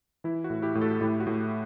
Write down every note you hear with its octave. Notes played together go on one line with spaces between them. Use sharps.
E3 E4
F#4
A2
E4 G4
A2
F#4 A4
A2 E4 G4
F#4
A2